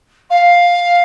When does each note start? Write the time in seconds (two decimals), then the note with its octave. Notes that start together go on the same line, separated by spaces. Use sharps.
0.30 F5